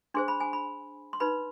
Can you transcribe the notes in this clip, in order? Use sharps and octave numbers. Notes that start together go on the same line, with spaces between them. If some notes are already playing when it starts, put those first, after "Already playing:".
D4 G#4 C5 C6
B5
G#5
B5
C6
D#4 B4 B5